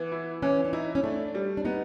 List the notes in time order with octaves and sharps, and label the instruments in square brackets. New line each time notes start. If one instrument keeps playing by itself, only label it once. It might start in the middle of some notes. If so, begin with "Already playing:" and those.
Already playing: [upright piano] E3 [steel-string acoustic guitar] B3
[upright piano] E4
[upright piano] E3 [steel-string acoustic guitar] C#4
[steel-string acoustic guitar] D4
[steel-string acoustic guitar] D#4 [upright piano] E4
[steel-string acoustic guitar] C#4
[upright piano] A3 [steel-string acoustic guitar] D4
[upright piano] G3
[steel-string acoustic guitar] D4
[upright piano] B3 [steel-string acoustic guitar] D#4